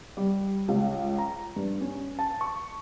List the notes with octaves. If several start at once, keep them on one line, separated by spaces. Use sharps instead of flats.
G3
C#2
A#5
G2
C#4
A5
C#6